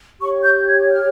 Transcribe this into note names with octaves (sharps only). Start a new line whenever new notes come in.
G4 C#5 C#6
G6
G#6
F6